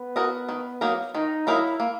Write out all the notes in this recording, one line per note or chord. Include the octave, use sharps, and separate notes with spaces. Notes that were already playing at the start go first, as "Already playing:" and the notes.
Already playing: B3
F#4 A#4 D#5
D#3
F#3 A#3 D#4 A#4
D#3 D#4
F#3 A#3 D#4 E4 A#4
A#3